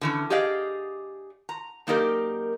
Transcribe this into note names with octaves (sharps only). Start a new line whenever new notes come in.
D3 E3 C#4
G4 G#4 D5 D#5 F5
A#5
F#2 A#3 D#4 G4 A#4 D5